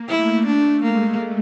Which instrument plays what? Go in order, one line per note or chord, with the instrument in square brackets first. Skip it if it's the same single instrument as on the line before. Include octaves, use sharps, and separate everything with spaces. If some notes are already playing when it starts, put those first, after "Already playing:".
Already playing: [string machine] A#3
[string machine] A3 [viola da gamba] E4
[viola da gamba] D4
[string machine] G#3 [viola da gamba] A#3